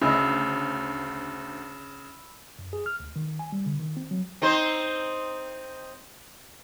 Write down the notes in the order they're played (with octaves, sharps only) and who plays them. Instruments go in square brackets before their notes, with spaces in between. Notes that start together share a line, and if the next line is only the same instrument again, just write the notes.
[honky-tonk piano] D2 [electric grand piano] C#3 [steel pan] E4 D#5 [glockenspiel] B5 E6
[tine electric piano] F#2
G#4
F6
D2
D#3
G#5
G3
D3
D#3
C4
F#3
[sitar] C4 D#4 C5